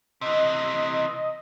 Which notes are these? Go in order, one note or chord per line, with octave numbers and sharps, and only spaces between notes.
C3 E3 D#5